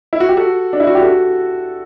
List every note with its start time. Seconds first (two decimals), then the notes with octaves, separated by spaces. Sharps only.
0.13 E4
0.20 F#4
0.29 G4
0.37 F#4 A4
0.73 D4
0.80 E4
0.87 F#4
0.95 G4
1.02 F#4 A4